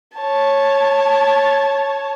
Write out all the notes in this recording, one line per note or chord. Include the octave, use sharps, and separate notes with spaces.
C#5 A5